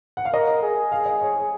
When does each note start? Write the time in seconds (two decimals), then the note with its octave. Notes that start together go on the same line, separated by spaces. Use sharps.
0.17 F#5
0.25 F5
0.33 A#4 D#5
0.63 G#4
0.92 F5
1.06 D#5
1.21 C#5